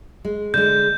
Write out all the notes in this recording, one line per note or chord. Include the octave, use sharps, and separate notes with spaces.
G#3
D3 G#3 G6